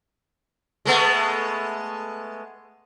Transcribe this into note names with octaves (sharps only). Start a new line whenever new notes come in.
G#3 A3 B3